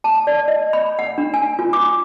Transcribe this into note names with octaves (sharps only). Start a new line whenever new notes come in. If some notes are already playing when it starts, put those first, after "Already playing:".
A5
D5
D#5
B5
F#5
D4
G#5
F4
D6